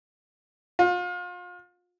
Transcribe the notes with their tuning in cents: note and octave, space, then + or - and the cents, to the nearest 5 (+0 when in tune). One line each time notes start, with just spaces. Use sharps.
F4 +35